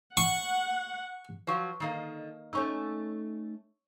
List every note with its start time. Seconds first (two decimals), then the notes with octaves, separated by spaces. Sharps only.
0.17 F#5 C#6
1.47 F3 F#3 B4 C#6
1.80 D3 D#3 A#3 D#4 D#5
2.53 A3 C#4 D#4 C#5 C#6 E6